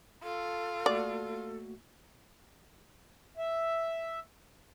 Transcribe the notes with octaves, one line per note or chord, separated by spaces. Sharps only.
F4 A4
A3 A#3 F#4 D5
E5